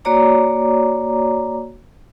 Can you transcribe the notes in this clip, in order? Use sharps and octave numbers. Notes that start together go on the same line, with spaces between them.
A#3 F#4 C#5 D5 A#5 D6